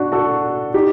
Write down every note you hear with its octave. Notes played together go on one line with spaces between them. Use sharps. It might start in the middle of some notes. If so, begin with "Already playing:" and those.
Already playing: D4 F#4
F#4 A4
D#4 G4